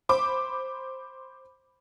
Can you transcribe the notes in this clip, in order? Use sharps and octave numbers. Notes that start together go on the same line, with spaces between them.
C5 B5 D6